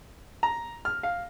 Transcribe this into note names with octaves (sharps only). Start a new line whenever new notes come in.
A#5
F6
F5